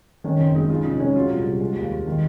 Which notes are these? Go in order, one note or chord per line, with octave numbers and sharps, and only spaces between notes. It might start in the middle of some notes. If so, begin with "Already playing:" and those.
D#3 C#4
F#1 C4
G#3 D#4
C#3 F4
F1 D#4
G#3 C#4
F#3 F4
C2
C2
G#3
D#2
D#2
D#3